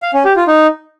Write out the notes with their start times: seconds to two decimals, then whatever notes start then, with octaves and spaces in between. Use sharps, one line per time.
0.02 F5
0.14 C#4
0.25 G4
0.36 F4
0.47 D#4